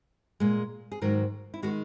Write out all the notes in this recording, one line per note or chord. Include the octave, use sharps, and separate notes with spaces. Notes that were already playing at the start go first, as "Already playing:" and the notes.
A#2 G#3
G#4
G#2 D#3 F#3 A#4
E4
D#3 G#3 F#4